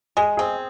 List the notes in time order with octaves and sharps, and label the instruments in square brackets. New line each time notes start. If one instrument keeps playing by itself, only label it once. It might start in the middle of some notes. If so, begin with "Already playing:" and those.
[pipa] G#3 [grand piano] G#4
[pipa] C4 [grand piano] G#4